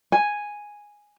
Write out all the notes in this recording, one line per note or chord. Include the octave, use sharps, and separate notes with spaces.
G#5